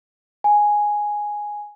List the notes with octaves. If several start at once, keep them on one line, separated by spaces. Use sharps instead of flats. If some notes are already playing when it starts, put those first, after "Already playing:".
G#5